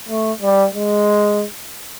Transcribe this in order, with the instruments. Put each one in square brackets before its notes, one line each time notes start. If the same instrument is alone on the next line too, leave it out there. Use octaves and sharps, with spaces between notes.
[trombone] A3
G3
G#3